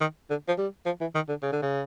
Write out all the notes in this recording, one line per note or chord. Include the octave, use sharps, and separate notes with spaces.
D#3
D3
F3
G3
F3
E3
D#3
D3
C#3
D3
C#3